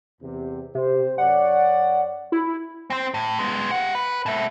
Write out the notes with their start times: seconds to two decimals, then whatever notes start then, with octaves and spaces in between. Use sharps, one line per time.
0.22 E2 C3
0.75 C3 C4 C5
1.18 F#2 C#5 D5 F#5
2.32 E4
2.90 C4 C5
3.14 A2
3.39 G#3 B3
3.71 G4 F#5
3.95 B4
4.26 B2 E5